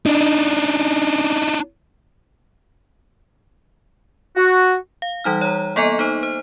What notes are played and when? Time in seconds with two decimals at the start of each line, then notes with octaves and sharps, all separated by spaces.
0.06 D4 D#4
4.37 F#4
5.02 F5
5.24 E3 G3 D#4 F6
5.41 C#5 A#5
5.76 A#3 B3 A4 D#5 G#5 A#5
5.99 D#4 C5
6.23 C5